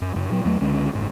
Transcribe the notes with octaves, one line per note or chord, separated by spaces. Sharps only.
F#2
F#2 C#3
A#2 F#3
E2 F#3 A3
C#2 D3 G#3 C#4
F#1 G#2